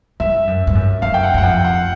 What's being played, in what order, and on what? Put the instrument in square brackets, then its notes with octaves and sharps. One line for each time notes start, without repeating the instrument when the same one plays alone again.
[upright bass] G2 [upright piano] E5
[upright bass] F#2
G2
F#2
[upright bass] F#2 [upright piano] F5
[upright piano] G5
F#5
[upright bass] F#2 [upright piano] F#5
[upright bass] F2 [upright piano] G5
[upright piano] F#5